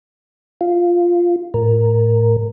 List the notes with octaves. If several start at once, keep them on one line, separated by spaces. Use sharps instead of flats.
F4
A2 A#4